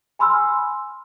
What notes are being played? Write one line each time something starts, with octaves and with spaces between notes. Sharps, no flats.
G#5 B5 C6 E6 F6